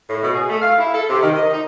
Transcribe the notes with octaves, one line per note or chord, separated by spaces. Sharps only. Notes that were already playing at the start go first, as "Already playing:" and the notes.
A2
B2
G#4
A3
F5
E4
A4
C3
D#3
D#5
D#4